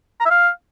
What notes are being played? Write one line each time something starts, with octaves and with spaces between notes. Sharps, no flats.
A#5
E5
F5